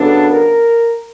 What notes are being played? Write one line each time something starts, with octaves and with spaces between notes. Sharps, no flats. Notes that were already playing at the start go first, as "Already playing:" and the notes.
Already playing: C#3 F#3 B3 D4 A4
A#4